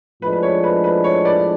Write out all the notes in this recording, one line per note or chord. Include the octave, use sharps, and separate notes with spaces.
A2 F3 G#3 D4 B4
B4
C#5
B4
B4
C#5
B4 D5